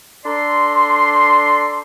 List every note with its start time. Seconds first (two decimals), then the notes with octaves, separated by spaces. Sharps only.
0.25 D4 A4 D5 A#5 C6